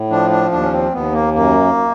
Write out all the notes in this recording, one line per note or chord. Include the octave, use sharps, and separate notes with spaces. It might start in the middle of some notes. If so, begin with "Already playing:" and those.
Already playing: A2
F3 D4
D4
D#2 D4
C#4
C4
D#2 B3
A#3
F#2 A#3